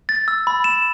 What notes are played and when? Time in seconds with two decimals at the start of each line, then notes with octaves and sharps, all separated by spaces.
0.09 A6
0.28 E6
0.47 B5
0.64 E7